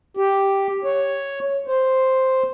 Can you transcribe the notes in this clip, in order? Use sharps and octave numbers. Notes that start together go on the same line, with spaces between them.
G4
C#5
C5